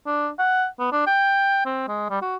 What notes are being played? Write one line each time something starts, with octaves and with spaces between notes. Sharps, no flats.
D4
F#5
B3
D4
G5
C4
G#3
G3
F#4